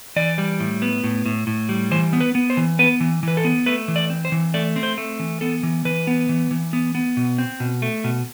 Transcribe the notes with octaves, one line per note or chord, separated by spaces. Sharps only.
E3 D5
G3
A2
B3
A2
A2
A2
G3
E3 C5
B3
B4
B3
C5
E3
B3 B4
E3
E3 B4
A4
B3
A3 B4
E3
D5
C4
C5
E3
A3 D5
C4
C5
A3
E3
B3 A4
E3
E3 B4
B3
E3
E3
B3
B3
B2
C4
B2
A3
B2